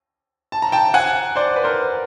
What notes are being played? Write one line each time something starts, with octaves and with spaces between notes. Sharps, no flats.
A5
A#5
G5 A5
F#5 G#5
C5 D5
B4
A#4 C5